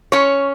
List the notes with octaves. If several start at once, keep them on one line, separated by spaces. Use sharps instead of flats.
C#4 C#5